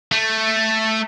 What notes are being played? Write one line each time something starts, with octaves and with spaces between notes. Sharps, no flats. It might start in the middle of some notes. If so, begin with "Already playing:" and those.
A3